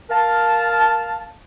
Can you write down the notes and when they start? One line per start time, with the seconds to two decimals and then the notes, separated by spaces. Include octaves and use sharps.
0.11 A#4 F5 A5